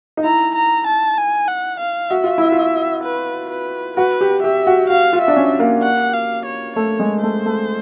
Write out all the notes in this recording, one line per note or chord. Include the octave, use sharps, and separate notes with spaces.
D#4
E4 A#5
A#5
A5
G#5
F#5
F5
F#4 E5
F4
E4
F4
B4
B4
F#4 B4
G4
G4 E5
F#4
F#4 F5
F4
E5
D4
C#4
A#3
F#5
F5
C#5
A3 C#5
G#3
A3 C5
A3